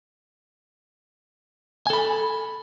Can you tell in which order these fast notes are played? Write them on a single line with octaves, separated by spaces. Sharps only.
G#5 A4 B5